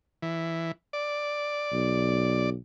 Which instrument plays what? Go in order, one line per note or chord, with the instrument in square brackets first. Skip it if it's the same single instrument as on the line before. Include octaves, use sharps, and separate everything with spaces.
[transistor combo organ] E3
D5
[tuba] B1